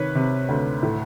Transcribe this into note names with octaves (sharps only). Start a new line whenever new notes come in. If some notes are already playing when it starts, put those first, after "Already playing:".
Already playing: C3 D#3 B4 C#5
C3
D2
A2